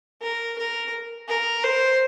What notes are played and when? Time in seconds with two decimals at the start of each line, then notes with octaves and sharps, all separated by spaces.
0.22 A#4
0.58 A#4
1.29 A#4
1.64 C5